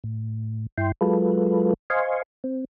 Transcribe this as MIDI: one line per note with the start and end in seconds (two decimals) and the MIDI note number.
0.04 0.66 45
0.78 0.92 43
0.78 0.92 64
0.78 0.92 79
0.78 0.92 84
1.01 1.74 54
1.01 1.74 56
1.01 1.74 65
1.01 1.74 69
1.01 1.74 71
1.90 2.22 72
1.90 2.22 75
1.90 2.22 77
1.90 2.22 80
1.90 2.22 84
1.90 2.22 85
2.44 2.65 60